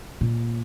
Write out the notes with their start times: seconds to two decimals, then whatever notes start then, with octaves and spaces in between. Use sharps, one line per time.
0.21 A#2